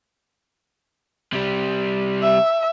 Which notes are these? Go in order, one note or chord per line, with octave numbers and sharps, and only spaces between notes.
C3 G3
E5